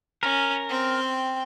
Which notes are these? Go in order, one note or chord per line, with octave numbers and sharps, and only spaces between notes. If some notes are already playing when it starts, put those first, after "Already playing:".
C#4 A#4
C4 G5